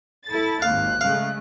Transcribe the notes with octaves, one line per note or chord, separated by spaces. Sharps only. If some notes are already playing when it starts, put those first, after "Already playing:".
E4 A4 A6
G#1 D#2 F5 F#6
C#3 G#3 A3 F5